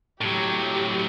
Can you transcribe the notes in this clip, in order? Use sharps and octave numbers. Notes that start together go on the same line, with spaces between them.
A2 F#3 G4